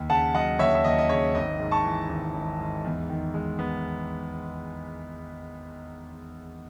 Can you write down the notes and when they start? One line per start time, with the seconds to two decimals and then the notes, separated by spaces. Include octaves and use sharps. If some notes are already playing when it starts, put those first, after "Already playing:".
Already playing: D#2
0.10 C#3 F#5 A5
0.34 F#3 D#5 F#5
0.59 D#2 C#5 E5
0.75 E5
0.84 D#2 D#5
0.98 D#5
1.09 C#3 C#5
1.35 G#1 D#5
1.60 G#2
1.71 A5 C#6
1.84 E3
2.09 G#1
2.35 G#1
2.59 G#2
2.84 E2
3.09 D#3
3.34 G#3
3.59 B3